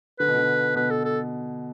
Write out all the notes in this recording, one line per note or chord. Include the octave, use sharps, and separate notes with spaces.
D3 B4
B2
D3
B2 B4
A4
A4